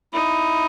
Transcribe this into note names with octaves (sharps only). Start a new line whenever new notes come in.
D#4 E4